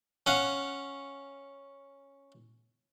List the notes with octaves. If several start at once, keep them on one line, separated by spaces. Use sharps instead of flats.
C#4 F5 F#5